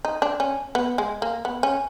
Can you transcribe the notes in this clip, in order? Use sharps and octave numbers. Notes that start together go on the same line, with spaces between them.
D#4
D4
C#4
B3
G#3
A#3
B3
C#4